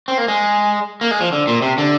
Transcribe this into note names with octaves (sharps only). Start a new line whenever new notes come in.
C4
A#3
G#3
A#3
G#3
F3
D3
A#2
C3
D3